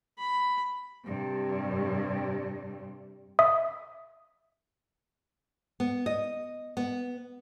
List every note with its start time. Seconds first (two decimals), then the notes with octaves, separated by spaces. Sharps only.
0.18 B5
1.05 G2 C3
3.39 E5 D#6
5.80 B3
6.06 D#5
6.77 B3